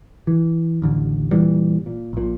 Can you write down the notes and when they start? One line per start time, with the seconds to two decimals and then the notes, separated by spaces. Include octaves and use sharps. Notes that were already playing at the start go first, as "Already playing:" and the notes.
0.27 E3
0.82 A1 D#2 D3
1.31 A#2 E3 G3
1.86 A#2
2.13 A#1 A#2